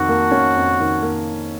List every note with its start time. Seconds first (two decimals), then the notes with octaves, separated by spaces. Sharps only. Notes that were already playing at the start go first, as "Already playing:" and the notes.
Already playing: F2 D#3 F#4
0.09 A#3
0.31 C#4
0.56 F2
0.80 D#3
1.03 A#3